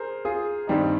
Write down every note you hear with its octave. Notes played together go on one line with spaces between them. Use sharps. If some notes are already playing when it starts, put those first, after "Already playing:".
Already playing: G#4 A#4 C5
F4 G#4
G2 D#3 G3 C4 D#4